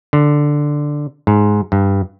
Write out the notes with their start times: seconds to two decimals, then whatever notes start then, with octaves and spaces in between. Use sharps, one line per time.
0.13 D3
1.27 G#2
1.72 G2